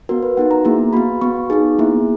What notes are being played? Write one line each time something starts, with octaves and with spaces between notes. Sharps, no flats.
B3 F#4 A#4
B4
B3 D#4 F#4 F#5
A#5
A#3 E4 G#4
B3 F#4 B5
B3 F#4 C#6
B3 D#4 G#4
A#3 E4 G#4